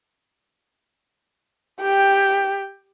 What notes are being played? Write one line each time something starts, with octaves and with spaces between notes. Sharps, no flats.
G4 G5